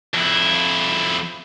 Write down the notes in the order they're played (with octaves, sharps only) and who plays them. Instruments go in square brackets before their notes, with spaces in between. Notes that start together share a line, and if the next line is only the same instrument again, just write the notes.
[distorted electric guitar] F2 E4